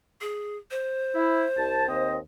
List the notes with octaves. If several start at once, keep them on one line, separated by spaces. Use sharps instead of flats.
G#4
C5
E4
C2 A5
D#2 C4 D#5